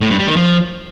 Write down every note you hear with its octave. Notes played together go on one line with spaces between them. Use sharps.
A2
G2
G3
D#3
F3